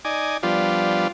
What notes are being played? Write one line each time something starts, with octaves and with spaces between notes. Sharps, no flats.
D#4 D5 G#5
F3 G3 B3 D4 F4